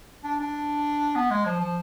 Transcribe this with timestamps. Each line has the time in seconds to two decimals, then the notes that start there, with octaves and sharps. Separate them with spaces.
0.24 D4
0.40 D4
1.15 B3
1.30 G#3
1.45 F3
1.61 F3